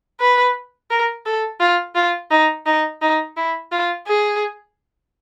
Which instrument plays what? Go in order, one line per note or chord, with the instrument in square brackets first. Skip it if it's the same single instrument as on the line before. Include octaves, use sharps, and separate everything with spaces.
[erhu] B4
A#4
A4
F4
F4
D#4
D#4
D#4
E4
F4
G#4